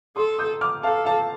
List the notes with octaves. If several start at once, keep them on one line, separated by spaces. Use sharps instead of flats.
A4 C6 D#6
D#6 G6
D6 F6
A4 F5 A5
F5 A5